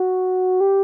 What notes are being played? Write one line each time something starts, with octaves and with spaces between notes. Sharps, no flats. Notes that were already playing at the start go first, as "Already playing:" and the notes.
Already playing: F#4
G4